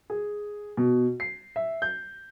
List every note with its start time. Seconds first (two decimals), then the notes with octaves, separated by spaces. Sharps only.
0.10 G#4
0.77 B2
1.20 C7
1.56 E5
1.82 G6